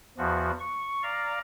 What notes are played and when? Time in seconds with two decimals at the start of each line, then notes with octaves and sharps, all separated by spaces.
0.18 E2 F3 F#4
0.59 C#6
1.03 D5 F5 A#5